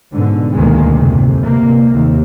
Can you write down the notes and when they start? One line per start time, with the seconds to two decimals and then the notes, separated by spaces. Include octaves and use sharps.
0.12 G#2 B2 D3
0.54 D2 B2 D#3 G#3 A#3
0.96 F2 G#2 C3
1.44 C3 A#3
1.93 D#2